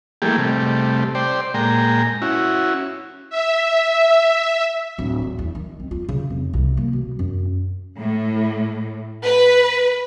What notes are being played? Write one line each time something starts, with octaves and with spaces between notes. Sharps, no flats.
E3 G3 A3 A#3 G4 G#4
C3 G3 A3
C5 D5 G5
A#2 G#3 G5 A#5
C#4 E4 F#4
E5
D1
D#3
E2
D#3
C4
F4
C#3
F1
C2
A#3
B2
F#2
A2
B4